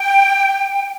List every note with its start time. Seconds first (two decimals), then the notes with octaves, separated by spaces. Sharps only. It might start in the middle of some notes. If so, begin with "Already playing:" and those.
Already playing: G5